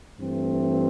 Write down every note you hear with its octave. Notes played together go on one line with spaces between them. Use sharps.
G2 E3 A3 C4